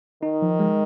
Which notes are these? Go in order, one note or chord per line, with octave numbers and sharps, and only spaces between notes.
D#3 D#4
F3
G#3